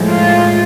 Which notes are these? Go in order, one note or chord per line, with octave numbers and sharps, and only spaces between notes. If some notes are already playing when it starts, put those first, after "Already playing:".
Already playing: A2 F3 G#3
F4